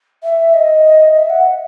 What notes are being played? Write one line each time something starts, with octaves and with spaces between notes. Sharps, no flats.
E5
D#5
E5
F#5